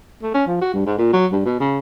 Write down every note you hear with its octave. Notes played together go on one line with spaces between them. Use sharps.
A3
C#4
F3
F#4
G2
G#2
A#2
F#3
G2
B2
C#3